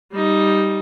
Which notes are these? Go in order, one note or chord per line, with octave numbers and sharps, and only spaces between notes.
G3 D#4